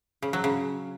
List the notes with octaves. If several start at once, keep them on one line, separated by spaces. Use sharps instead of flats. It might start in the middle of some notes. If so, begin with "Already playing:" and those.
C#3
F#3
C#3